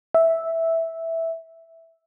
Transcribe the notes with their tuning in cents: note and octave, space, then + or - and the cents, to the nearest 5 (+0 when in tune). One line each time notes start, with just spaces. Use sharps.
E5 -5